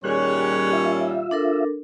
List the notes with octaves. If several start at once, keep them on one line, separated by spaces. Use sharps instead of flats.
A#2 D#3 G3 C#4 G#4 C#5 F#6
F4 E5
D4 A4 A#4